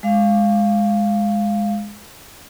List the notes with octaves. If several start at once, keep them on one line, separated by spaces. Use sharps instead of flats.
G#3 F5